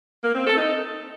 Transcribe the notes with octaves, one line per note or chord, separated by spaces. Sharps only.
A#3
C4
A4
D#4